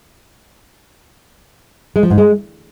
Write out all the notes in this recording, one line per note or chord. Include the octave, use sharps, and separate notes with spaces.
G#3
F3
G#2
G#3